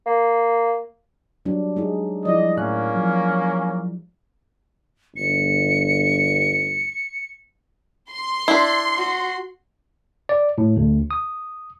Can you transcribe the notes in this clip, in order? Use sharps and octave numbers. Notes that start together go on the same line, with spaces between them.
A#3
F#3 G3 D4
G#3 D#4 G#4
F3 G3 E4 D5 D#5
A2 A#3 C#4 E5 F#6
F3 F#3
G1 C#7
C6
D4 E4
F#4
D5
A2
D2
D#6